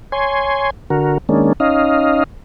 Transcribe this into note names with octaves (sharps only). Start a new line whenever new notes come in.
C#5 G#5 C6
D3 F#4 A#4
D#3 G#3 A#3 C#4 D4
C#4 D#4 D#5 F5